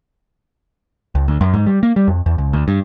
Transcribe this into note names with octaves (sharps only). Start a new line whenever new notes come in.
C#2
D2
F#2
G#2
G3
A#3
G3
F2
E2
C#2
D2
G2